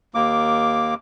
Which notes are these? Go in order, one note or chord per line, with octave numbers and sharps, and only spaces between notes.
D#2 A#3 D6